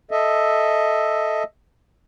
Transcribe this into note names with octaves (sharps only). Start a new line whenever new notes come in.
A4 D#5 E5